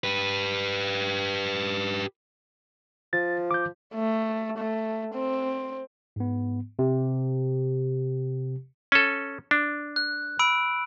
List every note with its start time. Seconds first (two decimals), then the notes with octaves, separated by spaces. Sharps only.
0.04 G4 B4
3.13 F3 A6
3.51 D6 G6
3.95 A3
4.58 A3
5.15 C4
6.16 G#2 B3
6.79 C3 G4
8.92 C#4 A4
9.51 D4
9.96 F#6
10.39 B5 E6 D7